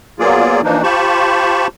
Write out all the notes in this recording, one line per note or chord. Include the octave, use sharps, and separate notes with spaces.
F#3 A#3 B3 F4 G#4 D5
E3 F3 A#3 D4 D#4
F4 G4 C5 A5 B5 C#6